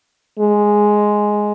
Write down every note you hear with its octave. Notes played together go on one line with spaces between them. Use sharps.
G#3